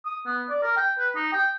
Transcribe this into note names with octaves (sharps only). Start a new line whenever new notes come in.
D#6
B3
D5
A#4
G5
B4
D#4
G5